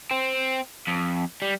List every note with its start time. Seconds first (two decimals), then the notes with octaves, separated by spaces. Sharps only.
0.11 C4
0.87 F2
1.42 G3